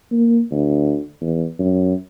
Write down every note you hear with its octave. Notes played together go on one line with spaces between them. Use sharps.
A#3
D2
E2
F#2